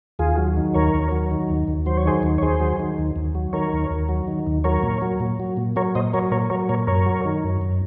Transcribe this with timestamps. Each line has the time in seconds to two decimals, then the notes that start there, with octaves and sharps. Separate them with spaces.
0.19 D#2 F4 G#4
0.38 F#3
0.57 D#3
0.74 D#2 A#4 C#5
0.94 D#2
1.12 F#3
1.31 D#3
1.50 D#2
1.68 D#2
1.86 F#3 C5
1.97 C#5
2.05 D#3 G#4 C5
2.23 D#2
2.38 C#5
2.42 D#2 G#4 C5
2.60 F#3
2.79 D#3
2.98 D#2
3.16 D#2
3.35 F#3
3.53 D#3 A#4 C#5
3.73 D#2
3.90 D#2
4.09 F#3
4.27 D#3
4.47 D#2
4.64 F#3 A#4 C#5
4.83 A#2
5.02 F#3
5.20 A#2
5.40 F#3
5.57 A#2
5.76 F#3 A#4 C#5
5.95 A#2 C5 D#5
6.13 F#3 A#4 C#5
6.31 A#2 A#4 C#5
6.50 F#3 A#4 C#5
6.69 A#2 A#4 C#5
6.87 F#2 A#4 C#5
7.06 F#3
7.25 D#3
7.44 F#2
7.61 F#2